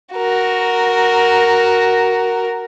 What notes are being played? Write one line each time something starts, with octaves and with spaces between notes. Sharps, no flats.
F#4 A#4